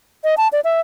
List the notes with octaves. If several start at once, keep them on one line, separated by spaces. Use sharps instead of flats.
D#5
A5
D5
E5